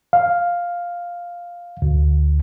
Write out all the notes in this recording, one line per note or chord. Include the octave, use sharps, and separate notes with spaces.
F5
D2